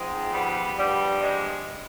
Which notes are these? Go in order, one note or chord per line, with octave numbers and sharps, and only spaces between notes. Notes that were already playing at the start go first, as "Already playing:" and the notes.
Already playing: G#2 F3 G#3 C4
G3 B3
G2 F3 G3
G#3